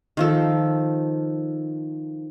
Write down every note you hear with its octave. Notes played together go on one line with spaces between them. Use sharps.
D#3 F3 A4